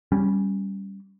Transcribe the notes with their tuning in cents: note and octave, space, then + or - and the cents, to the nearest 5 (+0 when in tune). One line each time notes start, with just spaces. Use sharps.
G3 +0 C#4 -5